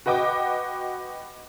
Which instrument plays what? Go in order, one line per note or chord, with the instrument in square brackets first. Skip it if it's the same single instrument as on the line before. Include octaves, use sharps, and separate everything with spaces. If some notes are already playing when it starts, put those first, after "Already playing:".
[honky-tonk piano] F#4 B4 D#5 G5 D6